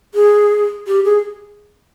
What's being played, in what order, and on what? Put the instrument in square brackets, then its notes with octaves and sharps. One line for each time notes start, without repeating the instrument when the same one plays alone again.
[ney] G#4
G4
G#4